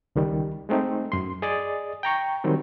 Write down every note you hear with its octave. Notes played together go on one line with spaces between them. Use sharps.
C#2 D#3 G3
G#3 A3 C4 D#4
F#2 C6
G#4 D5 D#5 D#6 A6
G5 A#5 C#6
D#3 F#3 G3 C4 D#4